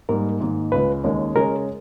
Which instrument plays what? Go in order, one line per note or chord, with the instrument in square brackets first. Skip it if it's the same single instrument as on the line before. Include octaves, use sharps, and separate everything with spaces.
[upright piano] G#2 G3 A#3 [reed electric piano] A#4
[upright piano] G#2 D#3 A#3
[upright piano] C#2 C#3 G#3 [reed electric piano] B4
[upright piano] D#2 D#3 G#3 C#4 G#4
[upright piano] C#3 G#3 C#4 G#4 C#5 [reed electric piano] A#4